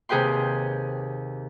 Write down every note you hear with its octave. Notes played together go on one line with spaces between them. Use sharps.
D#2 C3 G#4 B4 G5 C6